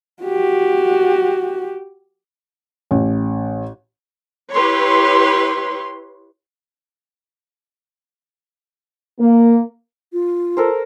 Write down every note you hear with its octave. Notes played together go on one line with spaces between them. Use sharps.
F#4 G4
A1
E4 G4 B4 C#5 C6
A#3
F4
A4 A#4 C5